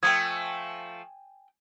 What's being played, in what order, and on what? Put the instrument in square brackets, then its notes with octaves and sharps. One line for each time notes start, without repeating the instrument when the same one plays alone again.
[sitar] F3 A3 [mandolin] G5 G#5 D#6 [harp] G#6